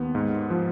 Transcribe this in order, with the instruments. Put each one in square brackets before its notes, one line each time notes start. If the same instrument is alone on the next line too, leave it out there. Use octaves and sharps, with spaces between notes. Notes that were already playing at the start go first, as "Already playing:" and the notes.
Already playing: [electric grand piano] D#2 B3
G#2
F3